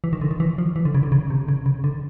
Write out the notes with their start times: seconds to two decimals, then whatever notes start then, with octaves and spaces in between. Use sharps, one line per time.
0.04 E3
0.13 D#3
0.21 D3
0.31 D#3
0.40 E3
0.58 F3
0.76 E3
0.85 D3
0.95 C#3
1.03 D3
1.12 C#3
1.30 C3
1.48 C#3
1.66 C#3
1.84 D3